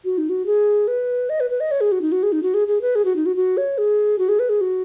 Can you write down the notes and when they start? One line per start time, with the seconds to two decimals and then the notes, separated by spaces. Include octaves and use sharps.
0.05 F#4
0.18 D#4
0.29 F#4
0.46 G#4
0.88 B4
1.30 D#5
1.40 B4
1.50 B4
1.60 D#5
1.71 C#5
1.81 G#4
1.92 F#4
2.02 D#4
2.12 F#4
2.23 G#4
2.32 D#4
2.43 F#4
2.54 G#4
2.68 G#4
2.82 B4
2.95 G#4
3.05 F#4
3.16 D#4
3.26 F#4
3.36 F#4
3.57 C#5
3.78 G#4
4.19 F#4
4.29 G#4
4.39 B4
4.49 G#4
4.61 F#4